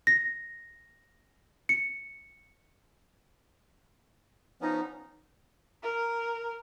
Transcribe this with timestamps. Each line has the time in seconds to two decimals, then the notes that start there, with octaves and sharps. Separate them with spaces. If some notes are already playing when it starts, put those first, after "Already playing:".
0.07 A#6
1.69 C#7
4.61 F3 B3 C#4 D#4
5.83 A#4